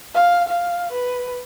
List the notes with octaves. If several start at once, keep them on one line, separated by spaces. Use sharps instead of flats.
F5
F5
B4